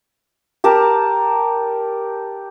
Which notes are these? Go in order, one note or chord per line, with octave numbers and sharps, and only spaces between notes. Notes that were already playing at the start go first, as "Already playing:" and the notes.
G4 A#4 A5